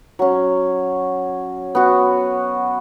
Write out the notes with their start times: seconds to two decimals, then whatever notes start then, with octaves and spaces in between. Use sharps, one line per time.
0.19 F#3 C#4
1.75 B3 F#4